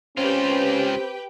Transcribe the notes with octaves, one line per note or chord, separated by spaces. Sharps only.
C#2 C4 C#4 F4 G4 B4 G5